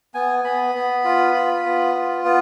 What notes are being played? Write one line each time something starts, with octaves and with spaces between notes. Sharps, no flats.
B3 G#5
B3 B5
B3
F4
F4
B3
F4
B3